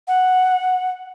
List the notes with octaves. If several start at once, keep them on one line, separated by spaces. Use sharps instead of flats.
F#5